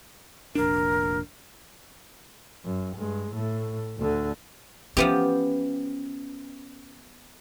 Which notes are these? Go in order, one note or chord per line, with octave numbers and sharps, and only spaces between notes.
F1 A#1 D4 A#4
F#2
G2 G#3
A2 A3
D2 D3
F3 B3 C#4 G4